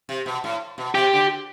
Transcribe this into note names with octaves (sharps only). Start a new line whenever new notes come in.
C3
B2
A2
B2
C3 G4
D3